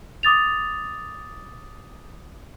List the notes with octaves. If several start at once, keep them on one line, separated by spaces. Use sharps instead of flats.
D6 D#6 A6 F7